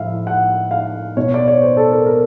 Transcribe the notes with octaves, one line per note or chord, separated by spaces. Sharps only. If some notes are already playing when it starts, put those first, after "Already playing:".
Already playing: A2 F3 E5 F5
F#5
F5
B2 C#5
D5
C#5
C5
A4
A#4
A#4